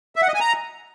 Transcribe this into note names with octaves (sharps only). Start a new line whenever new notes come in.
E5
F#5
D#5
G#5
A#5